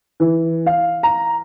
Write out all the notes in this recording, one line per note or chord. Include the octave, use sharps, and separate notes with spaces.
E3
F5
A#5